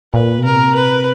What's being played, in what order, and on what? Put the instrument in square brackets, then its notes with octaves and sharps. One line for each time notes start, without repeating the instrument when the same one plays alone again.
[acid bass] A#2 [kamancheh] B4
[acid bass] B2
[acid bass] C3 [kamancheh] A#4
[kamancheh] B4